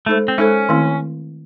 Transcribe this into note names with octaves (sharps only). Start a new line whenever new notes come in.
G#3 A3 D#4 A4 C5
C4
G#3 C#4 D#4 A4 C5
D#3 A3 C4 E4